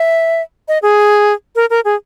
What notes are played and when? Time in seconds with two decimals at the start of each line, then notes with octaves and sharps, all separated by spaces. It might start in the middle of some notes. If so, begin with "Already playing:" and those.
Already playing: E5
0.68 D#5
0.82 G#4
1.56 A#4
1.70 A#4
1.85 G#4